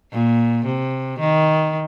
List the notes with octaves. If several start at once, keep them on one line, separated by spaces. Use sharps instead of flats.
A#2
C3
D#3